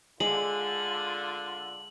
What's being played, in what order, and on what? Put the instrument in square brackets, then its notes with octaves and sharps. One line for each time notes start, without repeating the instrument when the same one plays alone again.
[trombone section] D3 F4 [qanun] G#3 [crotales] F#7